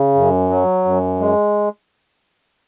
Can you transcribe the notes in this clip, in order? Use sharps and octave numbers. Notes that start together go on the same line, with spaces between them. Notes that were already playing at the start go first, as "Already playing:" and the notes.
Already playing: C#3
F#2
F#3
F#2
G#3